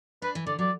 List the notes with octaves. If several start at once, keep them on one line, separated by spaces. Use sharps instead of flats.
D4 B4
E3
D3 D5
F#3 D5